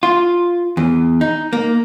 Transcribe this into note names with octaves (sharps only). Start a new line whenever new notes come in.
F4
E2
D#4
A#3